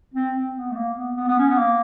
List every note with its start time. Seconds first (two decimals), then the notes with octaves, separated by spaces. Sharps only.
0.14 C4
0.35 C4
0.56 B3
0.71 A3
0.76 A#3
0.96 B3
1.17 B3
1.28 B3
1.38 C#4
1.49 B3
1.58 A#3